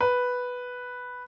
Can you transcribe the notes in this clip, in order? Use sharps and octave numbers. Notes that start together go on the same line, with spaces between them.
B4